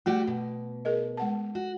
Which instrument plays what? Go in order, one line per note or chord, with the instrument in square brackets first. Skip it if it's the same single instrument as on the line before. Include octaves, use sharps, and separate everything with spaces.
[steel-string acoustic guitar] G3 F#4 G4 [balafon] A3
[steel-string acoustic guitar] B2
[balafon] G#4 A#4 D#5
G#3 F#5 A5
[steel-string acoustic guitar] F#4